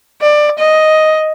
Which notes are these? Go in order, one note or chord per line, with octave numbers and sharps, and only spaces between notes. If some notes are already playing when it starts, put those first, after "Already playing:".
D5
D#5